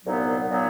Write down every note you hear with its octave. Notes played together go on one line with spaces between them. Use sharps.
C2 A#2 F#3 B3 D#4
A#2 F#3 B3 D#4